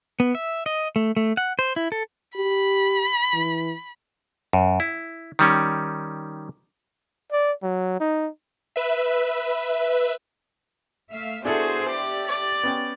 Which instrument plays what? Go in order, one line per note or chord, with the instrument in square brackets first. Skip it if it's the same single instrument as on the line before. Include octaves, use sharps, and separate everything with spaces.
[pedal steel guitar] B3
E5
D#5
A3
A3
F#5
C5
E4
A4
[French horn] G4 [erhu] B5
[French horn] E3
[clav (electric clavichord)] F#2
E4
D#3 G3 C#4
[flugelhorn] D5
F#3
D#4
[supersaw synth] B4 E5
[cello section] A3 E5 F5
[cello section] B3 F#4 C5 [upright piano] D4 E4 A4 [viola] G#4
[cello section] G4 [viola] D5
[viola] D5
[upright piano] B3 C#4 G5